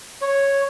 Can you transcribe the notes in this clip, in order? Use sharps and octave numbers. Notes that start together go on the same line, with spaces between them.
C#5